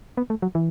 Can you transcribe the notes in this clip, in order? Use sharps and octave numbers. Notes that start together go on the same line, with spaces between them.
B3
A3
F#3
E3